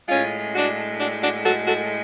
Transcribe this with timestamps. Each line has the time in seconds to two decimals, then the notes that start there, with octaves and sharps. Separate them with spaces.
0.09 A2 G#3 C#4 F4
0.54 D4 F#4
0.99 D4 F#4
1.21 D4 F#4
1.44 F#4 A4
1.66 F#4 A4